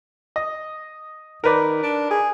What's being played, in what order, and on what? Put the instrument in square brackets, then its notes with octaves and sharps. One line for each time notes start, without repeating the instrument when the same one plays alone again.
[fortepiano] D#5
[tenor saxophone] D#3 [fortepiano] A#4 B4 D5
[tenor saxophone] D4
G#4